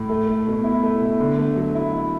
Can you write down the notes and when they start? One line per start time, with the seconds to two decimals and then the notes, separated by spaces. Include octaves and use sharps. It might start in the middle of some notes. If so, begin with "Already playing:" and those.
Already playing: A2
0.09 A3
0.27 A3
0.47 B2
0.64 E4
0.83 A3
1.01 B2
1.20 D3
1.38 A3
1.56 F#3
1.75 E4
1.94 E4